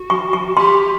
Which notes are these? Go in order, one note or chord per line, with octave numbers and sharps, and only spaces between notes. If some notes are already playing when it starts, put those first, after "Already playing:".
Already playing: F#4
C#6
C#6
G4 C6